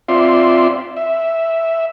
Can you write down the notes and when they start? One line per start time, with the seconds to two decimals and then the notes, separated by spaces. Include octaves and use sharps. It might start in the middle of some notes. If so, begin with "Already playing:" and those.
0.08 C4 F4 D5 E5 C6
0.97 E5